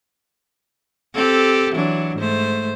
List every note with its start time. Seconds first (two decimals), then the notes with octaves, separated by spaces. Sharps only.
1.14 C4 G4 A4
1.73 E3 F#3 D4
2.17 G#2 A3 C5